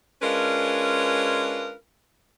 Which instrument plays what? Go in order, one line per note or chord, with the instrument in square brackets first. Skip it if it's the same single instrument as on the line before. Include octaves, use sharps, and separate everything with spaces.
[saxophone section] G#3 C#4 D4 F4 A#4 B4